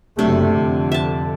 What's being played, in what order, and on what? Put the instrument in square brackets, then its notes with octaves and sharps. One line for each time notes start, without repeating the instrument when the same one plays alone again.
[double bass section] F#1 F#3 A3 [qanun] C3 D4
[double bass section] F2 D3
[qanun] E5 A5